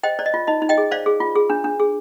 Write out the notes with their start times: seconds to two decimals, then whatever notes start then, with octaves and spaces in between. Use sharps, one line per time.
0.03 C5 D#5 G5
0.19 C5 D5
0.26 D#5
0.34 F4
0.47 D#4 D#5
0.62 D#4
0.69 D#5 G5
0.78 G#4
0.91 C5 D5 F5
1.06 G#4
1.20 F4
1.35 G#4
1.50 D4
1.64 D4
1.80 G#4